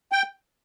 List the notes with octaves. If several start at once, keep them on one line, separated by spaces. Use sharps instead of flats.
G5